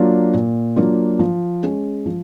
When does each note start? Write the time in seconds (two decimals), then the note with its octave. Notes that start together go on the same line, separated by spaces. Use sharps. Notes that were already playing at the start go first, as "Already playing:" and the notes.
Already playing: F#3 A#3 D4 F4
0.34 A#2
0.76 F#3 A#3 D4 F4
1.19 F3
1.63 G#3 C#4
2.06 F3